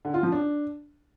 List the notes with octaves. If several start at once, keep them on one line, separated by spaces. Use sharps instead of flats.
D3
F4
F3
D4